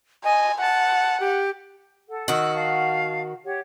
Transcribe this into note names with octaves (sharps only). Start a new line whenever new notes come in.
D#5 G#5
F#5 A5
G4
A4 F#5
D#3 F#4 E6
F5 A5
G4 C#5 F#5